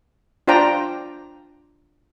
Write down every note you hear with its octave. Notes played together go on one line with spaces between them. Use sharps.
D4 F4 C5 D5 G5 A#5